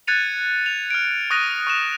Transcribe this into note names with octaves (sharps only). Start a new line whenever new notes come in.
F#6 G#6 A6 C#7 D#7 F7
F7
F6 D7
C#6 D#6 F#6 A#6 D#7
C#6 F#6 E7